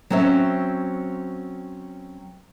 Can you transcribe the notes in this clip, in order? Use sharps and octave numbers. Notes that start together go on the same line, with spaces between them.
F#3 C4 C#4 C5 E5